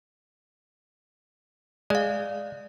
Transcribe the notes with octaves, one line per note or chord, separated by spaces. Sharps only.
G#3 D5 F5